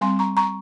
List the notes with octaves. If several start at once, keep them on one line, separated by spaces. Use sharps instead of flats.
G3 C4 G#5 C6
A#5 C#6
A#5 C#6